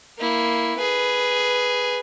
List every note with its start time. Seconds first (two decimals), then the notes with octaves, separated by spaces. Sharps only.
0.19 A#3 E4
0.78 G#4 B4